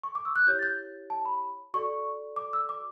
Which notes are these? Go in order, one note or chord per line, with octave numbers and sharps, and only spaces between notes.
C#6
D6
E6
F#6
E4 G4 C#5 G6
A6
G6
A5
B5
F#4 A4 D5 C#6
D6
E6
D6